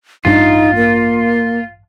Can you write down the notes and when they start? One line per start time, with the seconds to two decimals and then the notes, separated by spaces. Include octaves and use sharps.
0.25 A1 G2 D4 D#4 F4
0.75 A#3